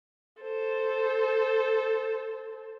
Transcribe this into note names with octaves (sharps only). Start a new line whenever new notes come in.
A4 C5